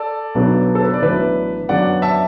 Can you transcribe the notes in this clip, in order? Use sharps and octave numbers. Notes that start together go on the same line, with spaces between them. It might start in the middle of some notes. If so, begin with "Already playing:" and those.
Already playing: A4 D5
B1 B2 F#3 B3 D4
A4
B4
D5
A1 A2 F#3 B3 D4 B4 E5
F#2 F#3 B3 D4 D5 F#5
E5 A5